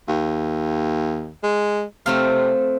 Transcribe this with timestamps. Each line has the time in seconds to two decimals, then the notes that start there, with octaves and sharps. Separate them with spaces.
0.08 D#2
1.43 G#3
2.06 C3 A3 C4 F5